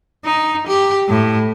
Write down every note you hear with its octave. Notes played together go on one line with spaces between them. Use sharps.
D#4
G4
A2